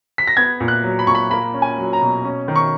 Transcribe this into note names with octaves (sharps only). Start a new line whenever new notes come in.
B6
A#6
B3 G#6
A#2
F#6
F#3
B5
A#2 C#6
B5
A#3 B5
C#4
G#5
F#3
A#5
B2
C#4
D#3
C#6